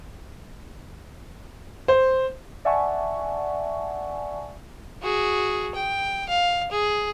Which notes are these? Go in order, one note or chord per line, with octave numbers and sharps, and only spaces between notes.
C5
D5 E5 F#5 G#5 A5 C#6
F#4 G#4
G5
F5
G#4